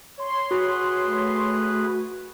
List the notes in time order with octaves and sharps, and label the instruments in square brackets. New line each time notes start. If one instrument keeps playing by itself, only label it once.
[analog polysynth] C#5 C6
[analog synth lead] F#4 [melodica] G#4 B4
[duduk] A3